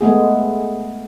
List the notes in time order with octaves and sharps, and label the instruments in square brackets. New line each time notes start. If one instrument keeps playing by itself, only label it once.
[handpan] G#3 A3 B3 G#4